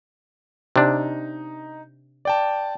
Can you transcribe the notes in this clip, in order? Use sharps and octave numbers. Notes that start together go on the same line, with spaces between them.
C3 D4 D#4
D5 G5 A5